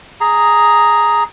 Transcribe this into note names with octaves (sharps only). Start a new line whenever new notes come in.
G#4 A#5